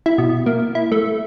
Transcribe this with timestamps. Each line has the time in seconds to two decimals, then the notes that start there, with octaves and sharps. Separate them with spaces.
0.06 E4
0.18 B2
0.46 A#3
0.75 E4
0.92 A3